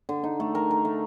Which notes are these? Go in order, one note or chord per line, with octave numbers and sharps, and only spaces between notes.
D3
D#4
A3
A#4
A#4
A3